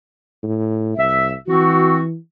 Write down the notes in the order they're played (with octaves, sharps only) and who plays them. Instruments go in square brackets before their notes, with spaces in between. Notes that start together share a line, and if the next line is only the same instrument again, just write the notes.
[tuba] A2
[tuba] C2 [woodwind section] E5
[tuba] E3 [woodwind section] C4 F#4